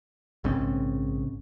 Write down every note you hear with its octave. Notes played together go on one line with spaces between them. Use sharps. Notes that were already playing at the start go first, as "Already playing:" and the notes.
A#1 G#2 C#3 C4